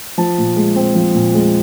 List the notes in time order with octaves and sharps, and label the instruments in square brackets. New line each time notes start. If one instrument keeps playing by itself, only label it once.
[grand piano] F3 A5
A#2
G#3
C4
F3
A#2
G#3